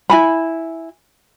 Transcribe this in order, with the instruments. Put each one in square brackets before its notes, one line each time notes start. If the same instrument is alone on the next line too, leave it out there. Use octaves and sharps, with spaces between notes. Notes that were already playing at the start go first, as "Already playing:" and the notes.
[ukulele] E4 G#5 B5